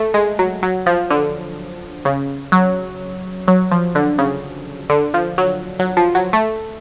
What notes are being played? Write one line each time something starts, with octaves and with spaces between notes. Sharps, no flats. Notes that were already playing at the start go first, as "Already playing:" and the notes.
Already playing: A3
G#3
F#3
F#3
F3
D3
C#3
F#3
F#3
F3
D3
C#3
D3
F3
F#3
F#3
F3
F#3
A3